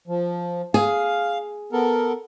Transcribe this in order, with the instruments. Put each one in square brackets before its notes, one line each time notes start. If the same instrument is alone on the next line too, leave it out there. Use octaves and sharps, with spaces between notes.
[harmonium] F3
[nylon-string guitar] G#4 [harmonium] F5
[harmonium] B3 A4 A#4